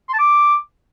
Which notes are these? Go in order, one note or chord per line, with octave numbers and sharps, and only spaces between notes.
C6
A5
D6